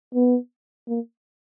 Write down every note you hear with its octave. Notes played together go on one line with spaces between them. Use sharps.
B3
A#3